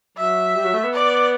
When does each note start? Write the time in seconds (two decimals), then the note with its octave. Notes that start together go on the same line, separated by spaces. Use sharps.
0.17 F#3 E5
0.55 G3
0.64 F#3
0.74 A3
0.84 B3
0.93 D5